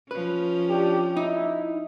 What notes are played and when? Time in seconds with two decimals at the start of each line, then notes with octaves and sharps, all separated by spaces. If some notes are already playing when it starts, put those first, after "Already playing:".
0.11 F3 C#4 B4
0.70 D4 G4
1.17 D#4 E4